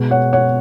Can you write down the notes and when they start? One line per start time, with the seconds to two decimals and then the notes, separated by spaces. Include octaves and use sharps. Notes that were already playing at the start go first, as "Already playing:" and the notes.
Already playing: B2 G#3
0.11 C#5 F#5
0.33 C#5 F#5